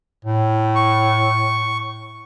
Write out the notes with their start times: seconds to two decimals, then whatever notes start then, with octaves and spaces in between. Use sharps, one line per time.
0.25 A2
0.75 C#6